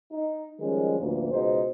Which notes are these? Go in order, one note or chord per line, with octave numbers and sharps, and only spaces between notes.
D#4
D#3 F3 G3 G#3 C#4
A1 D2 E3 F3 A#3
C#2 B2 D#4 C5